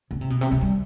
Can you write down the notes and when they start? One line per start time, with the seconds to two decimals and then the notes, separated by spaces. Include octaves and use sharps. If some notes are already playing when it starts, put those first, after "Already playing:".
0.11 C#3
0.21 C3
0.30 B2
0.41 C3
0.52 C#3
0.61 G3